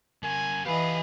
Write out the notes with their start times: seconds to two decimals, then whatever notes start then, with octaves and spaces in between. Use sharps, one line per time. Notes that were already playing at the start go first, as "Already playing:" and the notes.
0.23 C#3 A#4 G#5
0.66 E3 G4 B4 D#5 F5 G#5